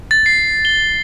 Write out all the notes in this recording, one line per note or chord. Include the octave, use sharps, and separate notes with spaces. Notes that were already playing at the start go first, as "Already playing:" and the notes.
A6
C7
G7